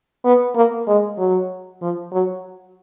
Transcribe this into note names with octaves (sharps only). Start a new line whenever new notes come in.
B3
A#3
G#3
F#3
F3
F#3